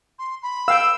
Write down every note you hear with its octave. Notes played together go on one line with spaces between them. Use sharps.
C6
B5
F5 G5 E6